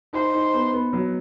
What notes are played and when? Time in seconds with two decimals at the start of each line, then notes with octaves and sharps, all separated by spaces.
0.13 D#4 C5
0.34 D#4
0.54 B3
0.73 B3
0.93 F#3